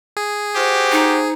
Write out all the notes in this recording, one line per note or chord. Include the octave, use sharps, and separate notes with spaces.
G#4
F#4 G4 C5
D#4